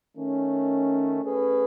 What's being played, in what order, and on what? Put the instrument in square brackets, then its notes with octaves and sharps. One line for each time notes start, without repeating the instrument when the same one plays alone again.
[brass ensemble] D#3 A3 C#4
A3 C#4 G#4 B4